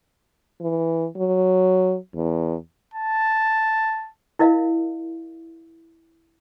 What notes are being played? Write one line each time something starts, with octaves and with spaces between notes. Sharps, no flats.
E3
F#3
E2
A5
E4 A#4 D#5 F5